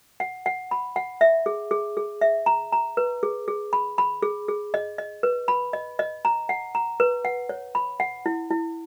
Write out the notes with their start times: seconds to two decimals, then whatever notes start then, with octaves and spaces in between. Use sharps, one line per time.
0.20 F#5
0.46 F#5
0.71 B5
0.96 F#5
1.21 E5
1.46 G#4
1.71 G#4
1.97 G#4
2.21 E5
2.46 A#5
2.73 A#5
2.97 B4
3.23 G#4
3.48 G#4
3.73 B5
3.98 B5
4.23 G#4
4.48 G#4
4.74 D#5
4.98 D#5
5.23 B4
5.48 B5
5.73 D#5
5.99 D#5
6.25 A#5
6.49 F#5
6.75 A#5
7.00 B4
7.25 F#5
7.49 C#5
7.75 B5
8.00 F#5
8.26 E4
8.51 E4